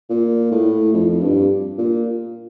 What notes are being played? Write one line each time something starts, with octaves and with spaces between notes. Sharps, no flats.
A#2
A2
F2
G2
A#2